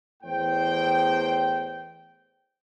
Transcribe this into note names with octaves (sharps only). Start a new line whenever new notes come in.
E2 A2 C5 G5